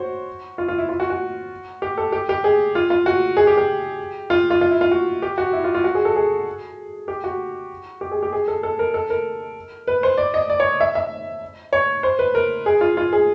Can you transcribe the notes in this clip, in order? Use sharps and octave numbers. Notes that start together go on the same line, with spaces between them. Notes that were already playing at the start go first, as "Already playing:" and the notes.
Already playing: F#4 C5 C#5
F4
F4
E4
F4
F#4
F#4
G4
A4
G4
G4
G#4
F4
F4
F#4
G#4
G4
G4
F4
F4
F4
E4
F4
F#4
G4
F#4
E4
F4
F4
F#4
G#4
A4
G#4
G4
F#4
G4
G#4
G4
G#4
A4
A4
A#4
A4
A#4
B4
C5
D5
D#5
D5
C#5
E5
E5
C#5
C5
B4
A#4
G#4
F4
F4
G#4